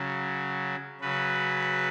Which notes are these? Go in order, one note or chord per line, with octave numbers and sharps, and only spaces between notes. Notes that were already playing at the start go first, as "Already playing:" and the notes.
Already playing: C#3 F#3
C#3 F#3 B4